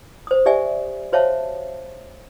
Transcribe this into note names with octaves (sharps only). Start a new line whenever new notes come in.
C5 D#6
G4 D5 E5 G#5
F#4 C5 C#5 E5 F5 A5